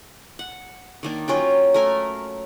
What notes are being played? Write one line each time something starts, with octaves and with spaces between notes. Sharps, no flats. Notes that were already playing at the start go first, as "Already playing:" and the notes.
F#5
D#3 A#3 D4
F#3 C#4 F4 G5
A3 A#4 G#5